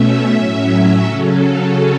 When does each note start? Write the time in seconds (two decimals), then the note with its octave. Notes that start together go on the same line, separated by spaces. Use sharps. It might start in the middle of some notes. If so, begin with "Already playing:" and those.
Already playing: B2 A3 C#4 E5
0.32 A2 F#3 C#4
1.03 C#3 F#3 C#4 A4
1.38 A4